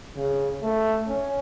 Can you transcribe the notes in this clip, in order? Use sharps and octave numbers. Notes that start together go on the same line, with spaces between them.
C#3
A3
C#4